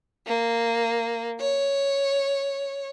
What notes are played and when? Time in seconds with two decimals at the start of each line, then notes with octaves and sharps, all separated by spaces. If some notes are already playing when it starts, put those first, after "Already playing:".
0.27 A#3
1.40 C#5